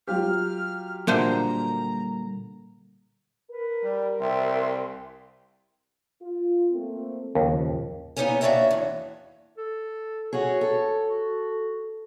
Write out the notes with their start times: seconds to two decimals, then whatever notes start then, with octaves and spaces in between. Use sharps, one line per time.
0.07 F#3 F4 G4 F6
1.07 A#2 D3 G3 A#3 C5 E5 A#5
3.50 A#4 B4
3.83 G3
4.21 C2 E5 G5 C6
6.22 F4
6.71 A3 A#3 C4
7.35 D#2 C#3 F3
8.16 A#3 B3 D#4 G4 C#5 G#5
8.41 A#3 D4 F#4 C#5 E5 G5
8.71 E2 G2
9.57 A4
10.33 F#4 G#4 C#5
10.61 A4
11.09 F#4